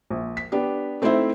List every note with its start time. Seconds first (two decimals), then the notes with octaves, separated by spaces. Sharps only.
0.10 A#1
0.37 B6
0.52 B3 D4 G4
1.02 A3 C4 D#4 E4 C5 E5